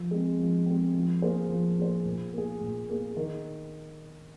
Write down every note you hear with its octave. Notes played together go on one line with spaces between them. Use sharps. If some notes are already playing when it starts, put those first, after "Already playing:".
Already playing: F3
G#3 C4
F3
G#3 C4
F3
A#3 G#4 C5
F3
A#3 G#4 C5
A#2
A#3 G#4
A#2
A#3 G#4
D#3